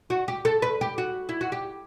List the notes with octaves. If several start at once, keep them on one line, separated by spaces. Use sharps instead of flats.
F#4
G4
A4
B4
G4
F#4
E4
F#4
G4